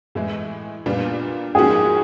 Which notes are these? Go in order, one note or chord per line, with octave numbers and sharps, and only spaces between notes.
A2 E3 G#3
A#2 G3 B3 D4 F4
G#2 F3 A#3 C#4 F#4 G#4